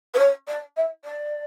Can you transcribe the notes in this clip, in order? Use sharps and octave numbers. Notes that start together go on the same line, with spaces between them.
B4
C#5
D5
E5
D5